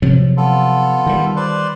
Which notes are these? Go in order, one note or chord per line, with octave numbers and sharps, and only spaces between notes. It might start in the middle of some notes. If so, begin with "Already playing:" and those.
C3 F3 F#3
B3 F4 A4
D#3 G3
B4 C5 D5